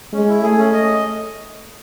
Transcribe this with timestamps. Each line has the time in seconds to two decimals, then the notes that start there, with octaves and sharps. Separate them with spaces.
0.13 G#3 C#4
0.28 E4
0.43 A3 G#4
0.58 C#4
0.73 D#5